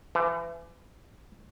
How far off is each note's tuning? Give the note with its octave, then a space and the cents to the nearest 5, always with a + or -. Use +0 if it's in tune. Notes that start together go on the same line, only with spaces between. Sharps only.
E3 +35